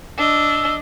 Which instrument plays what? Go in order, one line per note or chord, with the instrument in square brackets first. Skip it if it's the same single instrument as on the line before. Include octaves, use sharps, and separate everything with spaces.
[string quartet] D4 D#5 [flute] E6